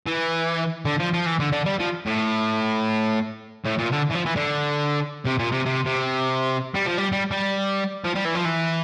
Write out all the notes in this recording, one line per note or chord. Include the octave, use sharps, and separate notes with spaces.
E3
D3
F3
F3
E3
D3
D3
G3
F3
A2
A2
A#2
D3
E3
F3
E3
D3
C3
A#2
C3
C3
C3
G3
F3
G3
G3
G3
F3
G3
E3
F3
E3